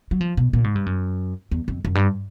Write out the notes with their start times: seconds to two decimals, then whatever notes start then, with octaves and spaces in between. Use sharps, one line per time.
0.11 F#3
0.21 F3
0.37 B2
0.53 A#2
0.64 G#2
0.75 G2
0.86 F#2
1.51 E2
1.68 F2
1.85 F#2
1.95 G2